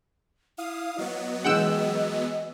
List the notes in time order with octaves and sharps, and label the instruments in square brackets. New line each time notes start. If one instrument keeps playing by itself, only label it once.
[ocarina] E4 [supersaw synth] F5 D#6
[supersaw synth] F#3 B3 [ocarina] D#5
[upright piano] E3 G#3 [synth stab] F#5 G5 E6